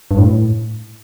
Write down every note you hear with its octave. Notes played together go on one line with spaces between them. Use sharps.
G2
A2